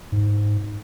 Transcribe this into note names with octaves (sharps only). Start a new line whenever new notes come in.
G#2